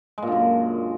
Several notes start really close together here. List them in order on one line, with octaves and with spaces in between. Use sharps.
G#3 A#2 D3 F#2